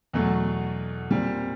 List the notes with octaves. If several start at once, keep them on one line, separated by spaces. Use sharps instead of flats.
E2 B2 F#3 A3
A#2 G3 C4